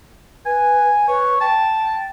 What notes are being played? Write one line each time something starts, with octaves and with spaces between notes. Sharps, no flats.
B4 G#5
B4 C#5
G5 A5